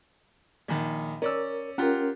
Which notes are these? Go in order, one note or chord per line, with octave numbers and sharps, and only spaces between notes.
A#1 D#3
C#4 A#4 D5 E6
C#4 F4 G4 A#4 F#5